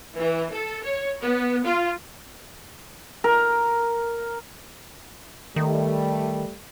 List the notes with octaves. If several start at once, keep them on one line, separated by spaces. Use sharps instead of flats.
E3
A4
C#5
B3
F4
A#4
D#3 G3 A3